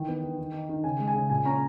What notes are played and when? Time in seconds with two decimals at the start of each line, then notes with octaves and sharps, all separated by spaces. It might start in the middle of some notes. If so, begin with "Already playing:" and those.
Already playing: D#3 E3 G5
0.08 B3
0.24 D#3
0.38 D#3
0.53 D#4
0.69 D#3
0.84 C#3 G#5
1.00 G#3
1.07 G#5
1.15 C#3
1.30 A#2 G#5
1.45 C#4 A#5